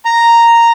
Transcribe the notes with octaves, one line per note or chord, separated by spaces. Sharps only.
A#5